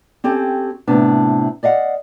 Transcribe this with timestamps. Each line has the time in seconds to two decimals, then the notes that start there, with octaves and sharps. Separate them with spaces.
0.24 C4 C#4 G4 A4
0.87 A2 C3 B3 D4
1.63 D5 D#5 F5 F#5